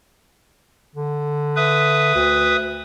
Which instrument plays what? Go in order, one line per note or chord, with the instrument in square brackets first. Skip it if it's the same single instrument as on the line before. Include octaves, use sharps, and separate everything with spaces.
[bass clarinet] D3
[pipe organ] B4 E5 D#6
[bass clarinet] D2